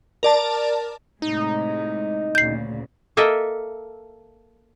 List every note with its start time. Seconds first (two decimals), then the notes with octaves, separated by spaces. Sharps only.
0.23 A#4 D5 A5
1.22 A2 C3 G#3 D#4
2.35 D2 A#2 C#3 G6 C7
3.17 A#3 A4 A#4 D#5 E5